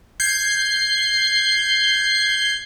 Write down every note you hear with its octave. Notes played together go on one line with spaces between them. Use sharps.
G6 G#6 C7